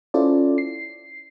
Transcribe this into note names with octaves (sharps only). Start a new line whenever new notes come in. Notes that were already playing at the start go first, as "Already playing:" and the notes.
C#4 E4 F4 A4 C5 D5
C7